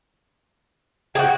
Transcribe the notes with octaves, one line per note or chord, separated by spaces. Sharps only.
F#4 G#4 G5